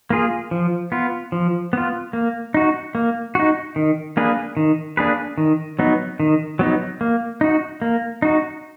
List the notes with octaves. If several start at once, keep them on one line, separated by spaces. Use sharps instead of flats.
A#3 F4 G#4
F3
B3 F4
F3
B3 F4
A#3
D#4 F#4
A#3
D#4 F#4
D#3
A#3 D4 G#4 B4
D#3
A#3 D4 G#4 B4
D#3
F#3 B3 D#4
D#3
F#3 B3 D#4
A#3
D#4 F#4
A#3
D#4 F#4